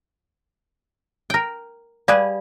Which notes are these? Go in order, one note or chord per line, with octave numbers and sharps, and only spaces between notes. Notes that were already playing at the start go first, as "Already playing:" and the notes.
A#4 G5
G3 G#4 B4 D5 F5